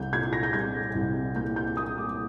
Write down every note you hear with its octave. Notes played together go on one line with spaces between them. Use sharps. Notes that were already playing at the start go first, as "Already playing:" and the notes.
Already playing: C2 G6
A#2 G#6
A#6
G6
G3 G#6
C2
A#3 G6
G6
A#3 D#6
D6